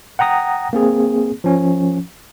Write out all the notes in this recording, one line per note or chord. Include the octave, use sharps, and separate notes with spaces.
F#5 G5 A#5 D#6 A#6
A#3 C4 G#4
F3 C#4